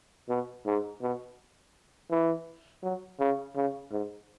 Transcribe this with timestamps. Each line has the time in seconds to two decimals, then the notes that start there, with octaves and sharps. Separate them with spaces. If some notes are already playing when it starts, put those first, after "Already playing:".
0.29 B2
0.66 G#2
1.02 B2
2.11 E3
2.83 F#3
3.19 C#3
3.56 C#3
3.92 G#2